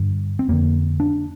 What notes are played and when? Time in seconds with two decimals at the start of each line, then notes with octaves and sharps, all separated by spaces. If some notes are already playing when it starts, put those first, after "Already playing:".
Already playing: G2 D3
0.39 C4
0.49 F2 D3 A#3
1.00 D4